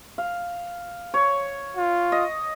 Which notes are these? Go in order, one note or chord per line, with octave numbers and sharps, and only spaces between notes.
F5
C#5
F4
D#5